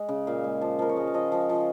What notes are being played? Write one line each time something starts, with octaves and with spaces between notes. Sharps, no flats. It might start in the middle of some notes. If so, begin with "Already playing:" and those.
Already playing: G#3
C#3
A#2 F5
G#3
F3
F3 A#4
C#5
G#3 D#5
F5
F3 D#5
F3
F3